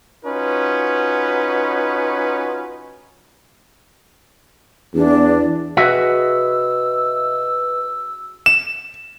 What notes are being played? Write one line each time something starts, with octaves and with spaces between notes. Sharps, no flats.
C#4 D#4 F4 F#4 B4
E2 D4
F#4 G#4 B4 D#5 E5 E6
E7